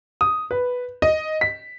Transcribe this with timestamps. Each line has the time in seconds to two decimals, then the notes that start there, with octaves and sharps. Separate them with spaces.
0.21 D#6
0.51 B4
1.02 D#5
1.41 B6